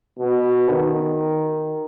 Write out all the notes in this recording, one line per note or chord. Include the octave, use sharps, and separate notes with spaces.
B2
D#3